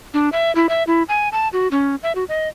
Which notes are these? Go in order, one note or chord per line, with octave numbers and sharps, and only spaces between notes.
D4
E5
E4
E5
E4
G#5
A5
F#4
C#4
E5
F#4
D#5